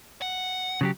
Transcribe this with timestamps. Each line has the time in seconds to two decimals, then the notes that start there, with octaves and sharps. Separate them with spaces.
0.22 F#5
0.81 C#3 F#3 G4